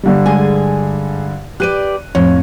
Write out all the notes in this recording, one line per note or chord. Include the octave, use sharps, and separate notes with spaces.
G2 D3 G3
G#3 G#4 G#5
G4 B4 D5 F#6 D#7
F2 A2 C#5